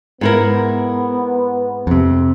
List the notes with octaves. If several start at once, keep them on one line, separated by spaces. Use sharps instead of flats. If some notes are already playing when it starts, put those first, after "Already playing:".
G#2 B3 E4 A#4
F2 C3